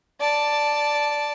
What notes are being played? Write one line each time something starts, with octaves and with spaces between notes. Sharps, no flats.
D5 A5